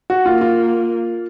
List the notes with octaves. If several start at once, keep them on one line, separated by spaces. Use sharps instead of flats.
F#4
A#3 F4
F4